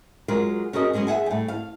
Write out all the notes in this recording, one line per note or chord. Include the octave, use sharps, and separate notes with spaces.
F#3 G#3 F4 A#4
C#4 F#4 G#4 A#4 D#5
F#3 G#3 B3 C#4
G#4 E5 F#5 G#5
A2 G3
F5